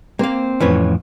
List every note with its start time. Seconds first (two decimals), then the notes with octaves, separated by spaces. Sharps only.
0.19 A#3 C4 C5 F5
0.60 F2 A2 E3 C#4 B4 C#5